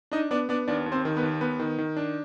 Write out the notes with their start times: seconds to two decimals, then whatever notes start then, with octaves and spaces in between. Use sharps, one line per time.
0.12 D4 D#4 D#5
0.31 B3 D4 D5
0.49 B3 D4 D5
0.68 D#2 D4 D5
0.86 D#2
0.92 C4 C5
1.05 D#3
1.17 B3 B4
1.23 D#2
1.41 B3 B4
1.60 D#3
1.78 D#3
1.97 D4